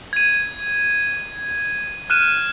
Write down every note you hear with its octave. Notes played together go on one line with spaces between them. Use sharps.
G#6 D#7
F6 F#6 D#7 E7